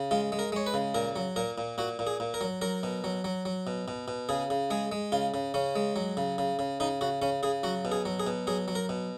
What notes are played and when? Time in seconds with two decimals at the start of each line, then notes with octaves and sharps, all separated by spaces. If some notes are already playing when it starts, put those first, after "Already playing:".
Already playing: C#3
0.11 G#3 F4
0.32 G#3
0.39 A#4
0.52 G#3 C#5
0.67 B4
0.74 C#3
0.94 A#2 A#4
1.16 F#3
1.36 A#2 A#4
1.58 A#2
1.78 A#2 F#4
1.99 A#2
2.07 G#4
2.20 A#2
2.34 A#4
2.41 F#3
2.62 F#3 A#4
2.83 B2
3.04 F#3
3.24 F#3
3.45 F#3
3.67 B2
3.88 B2
4.08 B2
4.29 C#3 G#4
4.50 C#3
4.71 G#3 G#4
4.92 G#3
5.12 C#3 F4
5.34 C#3
5.54 C#3 C#4
5.76 G#3
5.96 F#3
6.17 C#3
6.38 C#3
6.59 C#3
6.80 C#3 D#4
7.01 C#3 F#4
7.22 C#3 C#4
7.43 C#3 G#4
7.63 F#3 F#4
7.85 B2
7.92 G#4
8.06 F#3
8.20 G#4
8.27 B2
8.47 F#3 G#4
8.68 F#3
8.75 A#4
8.89 B2